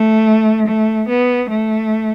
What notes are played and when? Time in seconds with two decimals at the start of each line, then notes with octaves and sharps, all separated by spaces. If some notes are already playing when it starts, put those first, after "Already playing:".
Already playing: A3
0.67 A3
1.08 B3
1.50 A3